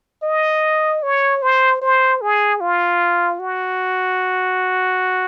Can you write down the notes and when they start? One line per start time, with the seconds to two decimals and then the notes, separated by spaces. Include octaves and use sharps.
0.23 D#5
1.03 C#5
1.42 C5
1.81 C5
2.21 G#4
2.60 F4
3.39 F#4